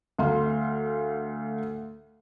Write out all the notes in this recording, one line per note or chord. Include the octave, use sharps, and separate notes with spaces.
D2 F5 C6